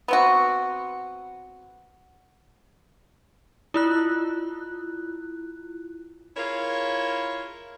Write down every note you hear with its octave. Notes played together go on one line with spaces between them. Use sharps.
B3 C4 F#4
E4 F4 F#6
E4 F4 G#4 A#4 C#5